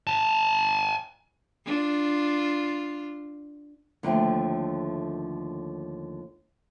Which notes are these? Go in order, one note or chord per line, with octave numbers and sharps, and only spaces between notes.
G#5 A5
D4 F4
D#2 D3 F3 A3 E4 G5